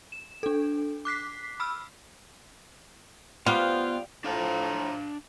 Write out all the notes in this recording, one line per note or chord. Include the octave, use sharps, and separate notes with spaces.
E7
D4 A4
D6 F#6 B6 C7
B5 E6 F6
G3 B3 F4 C5 F5 G5
A2 F3 D4 F5 A5 A#5